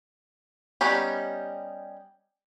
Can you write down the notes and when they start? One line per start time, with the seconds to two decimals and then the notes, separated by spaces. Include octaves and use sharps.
0.81 G3 B3 C#4 D#4 G4